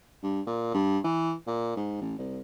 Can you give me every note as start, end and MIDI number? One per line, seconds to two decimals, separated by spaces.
0.23 0.41 43
0.47 0.74 46
0.74 0.98 43
1.04 1.34 52
1.47 1.73 46
1.76 1.98 44
2.01 2.16 33
2.18 2.41 36